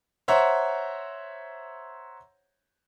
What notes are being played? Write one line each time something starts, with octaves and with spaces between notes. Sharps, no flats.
C5 C#5 E5 F#5 A#5